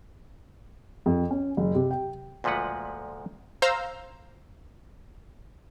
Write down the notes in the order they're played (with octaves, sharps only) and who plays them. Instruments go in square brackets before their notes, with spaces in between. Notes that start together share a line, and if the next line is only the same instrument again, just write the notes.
[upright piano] F2
C#4
F#1
C3
G5
[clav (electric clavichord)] D2 A#2 F3 G#3 B4 F#5
[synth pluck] C5 F5 A#5 E6 G6